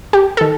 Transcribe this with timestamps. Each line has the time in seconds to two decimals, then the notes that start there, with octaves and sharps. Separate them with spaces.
0.13 G4
0.37 D#3 A4